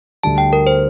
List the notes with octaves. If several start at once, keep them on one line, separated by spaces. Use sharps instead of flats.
D2 D3 G3 A5
G5
A#4
C5